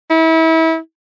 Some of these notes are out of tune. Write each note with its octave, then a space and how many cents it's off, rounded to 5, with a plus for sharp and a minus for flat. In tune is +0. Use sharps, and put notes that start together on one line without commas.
E4 -30